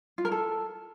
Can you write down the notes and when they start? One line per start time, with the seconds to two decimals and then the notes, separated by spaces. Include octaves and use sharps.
0.18 F4
0.25 A#4
0.32 A4